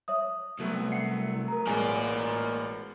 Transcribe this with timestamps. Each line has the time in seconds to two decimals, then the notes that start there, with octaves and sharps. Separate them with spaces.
0.08 C#5 E5 D#6
0.60 C2 F#3 A3 B3
0.92 F#5 C7 C#7
1.48 A#4 A#5
1.67 A1 B2 G#3 A#3 D5 G#5